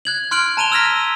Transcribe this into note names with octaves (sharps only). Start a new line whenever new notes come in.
F#6 G#6 F#7
C6 F6 F#6 D7 F#7
A5 A#5 D#7 F7 G7
E6 F6 G#6 A#6 B6